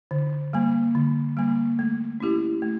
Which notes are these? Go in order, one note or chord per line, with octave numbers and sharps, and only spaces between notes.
D3
G3 A#3
D3
G3 A#3
A3
C#4 E4 G4
A3